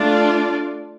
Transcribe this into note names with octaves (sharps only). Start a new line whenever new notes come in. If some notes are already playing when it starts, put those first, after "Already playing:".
Already playing: A3 D4 F4 D5